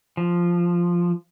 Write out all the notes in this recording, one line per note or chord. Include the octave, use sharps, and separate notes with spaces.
F3